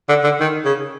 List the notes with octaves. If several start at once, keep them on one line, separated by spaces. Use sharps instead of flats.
D3
D3
D#3
C#3